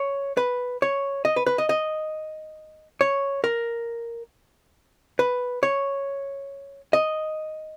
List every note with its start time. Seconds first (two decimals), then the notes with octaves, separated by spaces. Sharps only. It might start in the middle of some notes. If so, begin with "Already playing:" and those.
Already playing: C#5
0.37 B4
0.82 C#5
1.25 D#5
1.36 B4
1.47 B4
1.58 D#5
1.69 D#5
3.01 C#5
3.44 A#4
5.19 B4
5.63 C#5
6.93 D#5